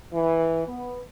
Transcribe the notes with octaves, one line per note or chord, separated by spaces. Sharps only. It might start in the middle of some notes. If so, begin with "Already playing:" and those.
E3
B3